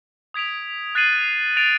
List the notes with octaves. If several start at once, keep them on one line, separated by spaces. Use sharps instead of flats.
D#6 G#6 B6 D7 F7
F#6 A6 C7 D#7 F#7
A6 D7 F7